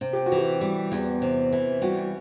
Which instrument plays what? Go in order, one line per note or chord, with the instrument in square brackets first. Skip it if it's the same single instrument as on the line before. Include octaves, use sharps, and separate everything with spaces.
[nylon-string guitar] C3
[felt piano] G4
F#4
[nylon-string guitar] E3
[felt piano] G4
[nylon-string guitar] G3
E2
C3
E3
[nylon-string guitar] G3 [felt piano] F#4